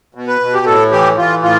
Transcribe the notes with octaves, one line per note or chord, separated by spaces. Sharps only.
B2
B4
B2
G4
A2 A4
E3 G4
E3 F4
A2 F4